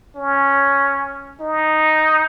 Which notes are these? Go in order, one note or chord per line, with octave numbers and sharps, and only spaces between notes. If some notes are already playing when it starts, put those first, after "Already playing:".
C#4
D#4